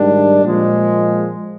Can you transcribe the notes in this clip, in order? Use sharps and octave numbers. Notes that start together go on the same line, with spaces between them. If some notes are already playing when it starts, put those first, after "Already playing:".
Already playing: G#2 D#3 G3 D4
A#2 F3 G#3